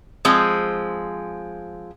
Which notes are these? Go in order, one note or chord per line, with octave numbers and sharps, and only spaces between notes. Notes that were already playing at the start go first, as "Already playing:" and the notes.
F3 G#3 C4